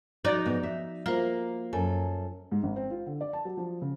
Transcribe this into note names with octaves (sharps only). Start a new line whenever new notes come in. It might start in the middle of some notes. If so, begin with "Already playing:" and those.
F3 D#4 F#4 D5
G#2 B3
E5
A#3 F4 A#4 C5
F#2 A4 G#5
G#2
G#1
C4
F4
D3
D5
A5
F#3
F3
C#3